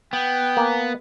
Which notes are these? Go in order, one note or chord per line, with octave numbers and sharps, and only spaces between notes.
B3 G5
A#3 G#5